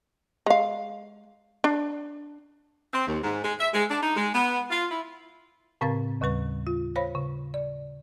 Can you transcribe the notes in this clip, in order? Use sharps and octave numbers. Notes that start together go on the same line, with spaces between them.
G#3 F5
D4
C4
D#2
G#2
G#3
E5
G#3
D4
D#4
G#3
B3
F4
E4
A2 C#3 C4 A#4 F5 A6
D#2 C#3 G3 B4 C#6
F4
C5 C#5 F5 B5
C#3
D5